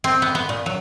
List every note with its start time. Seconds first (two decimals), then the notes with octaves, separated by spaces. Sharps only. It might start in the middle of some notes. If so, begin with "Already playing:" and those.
0.04 C4
0.22 B3
0.35 B3
0.49 A#2
0.66 F#3